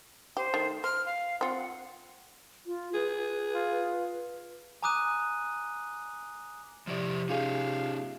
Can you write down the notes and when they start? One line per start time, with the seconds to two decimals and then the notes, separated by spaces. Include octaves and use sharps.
0.37 G4 C5
0.54 D#3 A3
0.84 C5 F6
1.06 F5
1.41 C4 F4 F#5
2.66 F4
2.94 G#4 B4
3.54 F4
4.82 G#5 A#5 D6 D#6 F#6 D#7
6.87 C3 F3 E4 D5
7.29 C#4 D#4 F4 G#4 F5